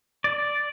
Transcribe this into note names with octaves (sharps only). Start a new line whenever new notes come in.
D5